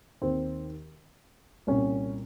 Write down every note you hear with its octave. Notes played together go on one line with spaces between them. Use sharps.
D#2 D#3 C4
C2 A#2 C#4